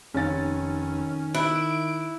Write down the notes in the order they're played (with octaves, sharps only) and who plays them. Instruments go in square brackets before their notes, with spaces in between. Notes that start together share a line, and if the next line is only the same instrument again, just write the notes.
[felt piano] F1 C#5 A6 [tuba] D#3 [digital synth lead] C#4
[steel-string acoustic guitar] E4 [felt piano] F#6 [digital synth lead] D7